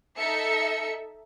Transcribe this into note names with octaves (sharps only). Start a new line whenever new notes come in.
D#4 A4 E5 C#7